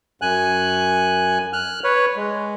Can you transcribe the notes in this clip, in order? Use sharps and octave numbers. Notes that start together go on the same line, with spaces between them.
F#2 G#5 F#6
F6 F#6
B4 C#5
G#3